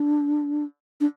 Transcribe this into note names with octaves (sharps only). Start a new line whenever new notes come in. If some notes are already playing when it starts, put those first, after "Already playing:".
Already playing: D4
D4